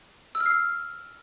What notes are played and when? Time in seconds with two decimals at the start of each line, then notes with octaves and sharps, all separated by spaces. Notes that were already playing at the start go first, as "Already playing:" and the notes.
0.35 E6
0.40 F6
0.46 C7